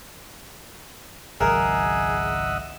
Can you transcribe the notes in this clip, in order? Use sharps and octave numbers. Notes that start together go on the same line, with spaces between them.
G#1 C#2 F#3 G#4 A#4 D#5 E5 F#5